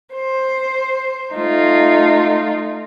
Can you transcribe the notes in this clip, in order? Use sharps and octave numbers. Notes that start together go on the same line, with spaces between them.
C5
A3 D#4 F4